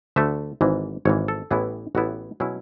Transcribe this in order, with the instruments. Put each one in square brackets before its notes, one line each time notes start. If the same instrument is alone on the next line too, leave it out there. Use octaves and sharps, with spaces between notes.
[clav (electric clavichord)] D2 D3 A3 E5
G#1 G#2 E3
G#1 G#2 E3 C#5
A4
A1 A2 E3 B3 E4 G#4
A1 A2 E3 B3 E4 F#4
B2 F#3 C#4 E4 G#4